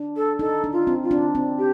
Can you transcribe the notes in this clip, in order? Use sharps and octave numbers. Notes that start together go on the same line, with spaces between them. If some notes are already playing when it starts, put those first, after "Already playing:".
Already playing: D4
A4
D#4 A4
D4
F4
C4
F4
D4
C4
G4